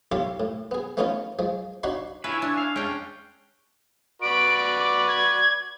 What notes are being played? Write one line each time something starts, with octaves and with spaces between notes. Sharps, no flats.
E4 F4 G4 A4 C#5 C6
A2
B3 G#4
A3 B3 C#4 D#4 F4 C#5
F3 G#3
D4 D#4 F#4 C#5 D#5 C6
E4 F4 B4 C#5 E5 G#5 B5
D4
F5
G#3 C#4 D4 F5 G5
F#4 B4 D5 D7
D6
G#6